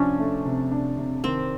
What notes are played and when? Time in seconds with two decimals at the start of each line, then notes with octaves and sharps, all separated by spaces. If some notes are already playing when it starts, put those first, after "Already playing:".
Already playing: C3 F3 C#4 D4
0.19 A3
0.45 C3
0.71 D4
0.98 C3
1.24 D#3 C4